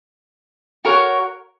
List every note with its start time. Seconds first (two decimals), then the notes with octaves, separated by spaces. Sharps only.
0.85 F#4 A#4 C#5 F#5